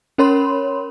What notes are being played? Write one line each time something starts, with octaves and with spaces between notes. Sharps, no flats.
C#4 A#4 C#5 B5 C6